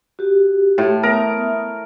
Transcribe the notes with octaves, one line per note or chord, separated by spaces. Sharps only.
F#4 G4
A2
B3 A#4 E5 D#6